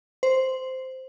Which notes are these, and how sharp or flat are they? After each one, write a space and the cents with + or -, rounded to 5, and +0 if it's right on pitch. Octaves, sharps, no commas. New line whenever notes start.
C5 -5